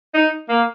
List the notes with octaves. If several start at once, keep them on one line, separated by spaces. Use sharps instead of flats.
D#4
A#3